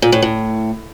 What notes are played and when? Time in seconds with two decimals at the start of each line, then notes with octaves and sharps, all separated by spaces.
0.02 A#2
0.12 A2
0.22 A2